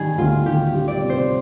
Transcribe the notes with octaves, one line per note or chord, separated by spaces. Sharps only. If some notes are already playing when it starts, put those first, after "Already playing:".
Already playing: D#3 G3 G#4
D2 F4
D#3 G4
G3
D5
C3
C5